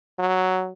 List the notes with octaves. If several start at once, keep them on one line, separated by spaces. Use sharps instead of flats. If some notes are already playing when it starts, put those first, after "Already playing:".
F#3